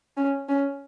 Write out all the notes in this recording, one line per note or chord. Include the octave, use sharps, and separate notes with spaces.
C#4
C#4